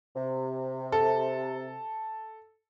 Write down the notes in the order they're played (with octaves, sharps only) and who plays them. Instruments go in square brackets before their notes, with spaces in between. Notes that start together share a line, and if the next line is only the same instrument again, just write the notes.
[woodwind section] C3
[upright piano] A4